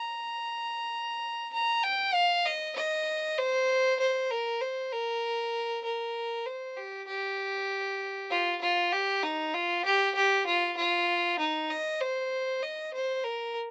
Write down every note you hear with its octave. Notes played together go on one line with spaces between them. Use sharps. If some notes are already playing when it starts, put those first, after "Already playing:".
Already playing: A#5
A#5
G5
F5
D#5
D#5
C5
C5
A#4
C5
A#4
A#4
C5
G4
G4
F4
F4
G4
D#4
F4
G4
G4
F4
F4
D#4
D#5
C5
D#5
C5
A#4